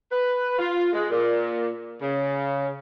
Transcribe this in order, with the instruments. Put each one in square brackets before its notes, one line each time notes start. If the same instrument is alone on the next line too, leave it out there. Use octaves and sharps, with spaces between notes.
[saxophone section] B4
F4
G#3
A#2
C#3